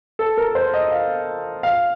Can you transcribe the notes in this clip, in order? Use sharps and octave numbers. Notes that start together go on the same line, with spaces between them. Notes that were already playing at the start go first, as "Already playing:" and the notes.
A4
A#4
C5
D#5
F5
F5